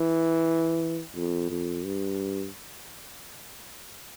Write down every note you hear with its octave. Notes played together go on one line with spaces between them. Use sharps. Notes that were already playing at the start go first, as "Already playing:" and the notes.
Already playing: E3
F2
F2
G2